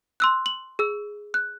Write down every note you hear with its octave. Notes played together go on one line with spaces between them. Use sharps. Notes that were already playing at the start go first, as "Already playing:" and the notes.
C6 E6 F#6
F#7
G#4 E6
F#6